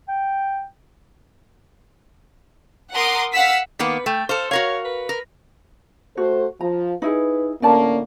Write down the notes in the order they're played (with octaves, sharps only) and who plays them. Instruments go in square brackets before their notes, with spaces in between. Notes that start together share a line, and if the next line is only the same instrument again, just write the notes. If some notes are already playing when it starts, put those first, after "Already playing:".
[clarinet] G5
[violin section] A#4 F#5 C6 D6 D#6
F5 F#5 E6 B6
[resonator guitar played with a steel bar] D#3 A#3 B3 [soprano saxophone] B4
[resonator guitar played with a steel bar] A3 [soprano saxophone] G5
[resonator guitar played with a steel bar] A4 C5 [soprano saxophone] F5
[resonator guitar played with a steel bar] F#4 A#4 F5 [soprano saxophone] C#5
[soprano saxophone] B4
[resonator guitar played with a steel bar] A#4
[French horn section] A3 A4 C5 [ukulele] F#4
[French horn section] F3 F4 [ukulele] A#5
[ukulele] D#4 E4 G#4 [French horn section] B4
[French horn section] A2 D3 A#3 [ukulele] C#4 D5 A5